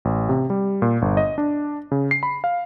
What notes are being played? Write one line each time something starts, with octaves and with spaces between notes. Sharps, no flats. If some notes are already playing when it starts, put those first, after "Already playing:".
A1
C3
G3
A#2
G1
D#5
D4
C#3
C7
B5
F5